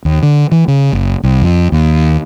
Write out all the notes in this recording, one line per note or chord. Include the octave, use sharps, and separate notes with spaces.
D#2
D3
E3
C#3
F#1
C2
F2
D#2